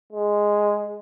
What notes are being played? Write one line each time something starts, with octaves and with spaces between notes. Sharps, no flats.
G#3